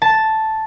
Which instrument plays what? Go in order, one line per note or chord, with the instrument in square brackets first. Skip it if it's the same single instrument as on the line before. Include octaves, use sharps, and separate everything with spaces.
[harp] A5